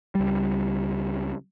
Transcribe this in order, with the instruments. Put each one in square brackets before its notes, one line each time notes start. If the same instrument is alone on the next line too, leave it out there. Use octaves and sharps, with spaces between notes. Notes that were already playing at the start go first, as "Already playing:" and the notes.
[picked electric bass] C#2 G3